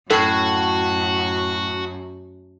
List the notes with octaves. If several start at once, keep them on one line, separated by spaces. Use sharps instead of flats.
F#2 A2 F#4 A4 C7